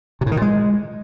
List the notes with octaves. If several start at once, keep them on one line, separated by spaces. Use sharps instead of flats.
C3
A2
D#3
A#2
G#3